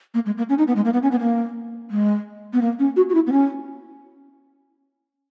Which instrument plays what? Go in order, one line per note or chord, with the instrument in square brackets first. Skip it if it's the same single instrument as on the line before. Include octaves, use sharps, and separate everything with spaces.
[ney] A#3
G#3
A#3
C#4
D#4
B3
G#3
A#3
B3
C#4
B3
A#3
G#3
B3
A#3
C#4
F#4
F#4
E4
B3
C#4